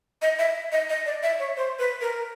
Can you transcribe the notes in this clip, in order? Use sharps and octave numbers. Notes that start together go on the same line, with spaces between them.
D#5
E5
D#5
D#5
D5
E5
C#5
C5
B4
A#4